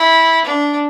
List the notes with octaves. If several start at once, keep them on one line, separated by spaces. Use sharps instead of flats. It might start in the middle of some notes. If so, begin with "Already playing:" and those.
Already playing: E4
D4